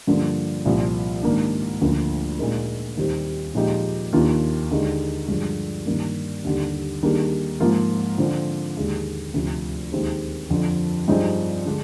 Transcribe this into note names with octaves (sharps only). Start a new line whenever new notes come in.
G2 D3 F3 A#3
C2 A#2 F3
G#2 D#3 A#3 D4
D2 D3 F3 A#3 F4
A#2 G#3 D#4 A#4
D#2 D#3 G3 C4 G4
A#2 F3 G#3 D#4 G4
D#2 D#3 A#3 D4 F4
D#2 D3 G#3 D#4
G2 D3 F3 G#3
G2 D#3 A#3
D#2 D3 G3
D#3 G3 A#3 D4 G#4
G#2 F3 A#3 F4
D3 F3 C4 F4
D#2 D3 G#3
D2 C3 F3
D#2 D#3 G#3 C4
F2 D3 F3
G2 F3 C4 D#4 G#4
D3 G#3 D4